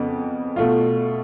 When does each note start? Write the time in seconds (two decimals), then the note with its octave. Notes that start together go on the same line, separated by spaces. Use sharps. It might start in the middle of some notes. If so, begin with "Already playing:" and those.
Already playing: F2 C#3 B3
0.56 B2 A3 F4